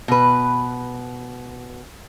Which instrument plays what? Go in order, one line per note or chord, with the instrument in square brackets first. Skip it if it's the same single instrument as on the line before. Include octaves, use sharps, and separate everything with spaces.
[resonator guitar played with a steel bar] B2 B4